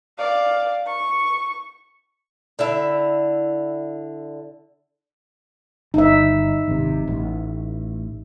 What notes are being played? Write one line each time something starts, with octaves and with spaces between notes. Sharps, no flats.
D5 F5
C#6
D3 E4 E5
G1 D#4 E5
G#1 C3
A1